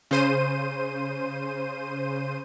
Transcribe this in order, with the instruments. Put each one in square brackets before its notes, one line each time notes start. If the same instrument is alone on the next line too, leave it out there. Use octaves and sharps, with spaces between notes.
[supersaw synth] C#3 C5 D#7